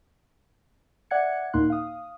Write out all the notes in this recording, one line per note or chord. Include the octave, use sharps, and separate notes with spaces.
D5 E5 F#5 F#6 G#6 C#7
D#2 A#2 A#3 D#4 C6 F#6
F5 D#6